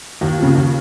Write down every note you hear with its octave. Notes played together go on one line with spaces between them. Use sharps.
D#2
C#3 F3
D#2